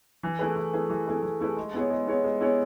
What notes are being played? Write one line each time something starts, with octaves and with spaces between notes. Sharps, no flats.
E3
A3 E4 G#4 B4
E3
A3 E4 G#4 B4
E3
A3 E4 G#4 B4
E3
A3 E4 G#4 B4
G#3
B3 E4 G#4 C#5
G#3
B3 E4 G#4 C#5
G#3
B3 E4 G#4 C#5